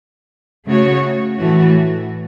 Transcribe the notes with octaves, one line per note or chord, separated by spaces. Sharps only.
C#3 A3 F#4 C#5
A2 E3 A3 F#4